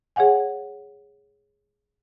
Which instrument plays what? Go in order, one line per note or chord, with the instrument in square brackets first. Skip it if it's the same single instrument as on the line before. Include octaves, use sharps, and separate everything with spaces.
[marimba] G#4 C#5 F5 F#5 G#5